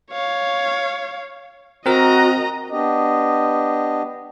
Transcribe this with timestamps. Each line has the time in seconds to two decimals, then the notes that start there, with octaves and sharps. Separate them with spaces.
0.11 C#5 F5
1.86 C4 F#4 A#4 D#5 A#5
2.70 B3 D4 G4 D#5